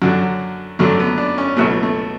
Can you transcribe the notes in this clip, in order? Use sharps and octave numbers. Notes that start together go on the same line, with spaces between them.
F#2 D3 F#3 F#4
F#2 D3 F#3 A3
B3
D4
C#4
C#2 B2 F#3 A3
A3